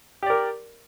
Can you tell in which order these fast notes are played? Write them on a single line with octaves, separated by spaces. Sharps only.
G4 D5 A#4